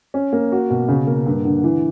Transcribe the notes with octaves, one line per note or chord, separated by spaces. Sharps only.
C#4
A#3
F#4
B2
C#3
A#3
G2
D3
E3